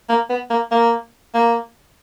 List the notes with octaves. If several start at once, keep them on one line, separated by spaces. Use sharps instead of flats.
A#3
B3
A#3
A#3
A#3